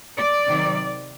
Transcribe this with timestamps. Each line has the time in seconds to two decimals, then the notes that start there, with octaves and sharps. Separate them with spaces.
0.18 D5
0.47 C3 D#3 F#3 C4